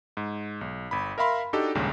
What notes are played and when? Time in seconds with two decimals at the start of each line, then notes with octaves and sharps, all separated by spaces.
0.17 G#2
0.61 B1
0.91 G1 B5
1.18 A#4 E5 F5 B5 C6
1.53 D4 D#4 F#4 G4 A4
1.75 A#1 D#2 G#2 C#3 G3